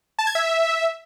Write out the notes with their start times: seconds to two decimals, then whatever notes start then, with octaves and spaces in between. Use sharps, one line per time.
0.19 A5
0.27 G#6
0.35 E5